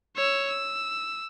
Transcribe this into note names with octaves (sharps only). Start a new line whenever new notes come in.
C#5 E6
E6